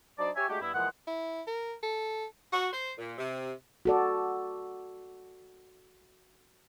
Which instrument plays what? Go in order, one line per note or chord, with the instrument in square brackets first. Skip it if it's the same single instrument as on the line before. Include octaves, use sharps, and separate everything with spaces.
[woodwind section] F#3 D4 D#4 C5 D5
G4 C#5 E5 G#5
G#3 A3 D4 F#4 G4
G2 B3 E4
A#2 E3 F3 G#3 F#5
[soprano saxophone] E4
A#4
A4
[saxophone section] F#4
C5
A#2
C3
[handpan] F#4 A4 D5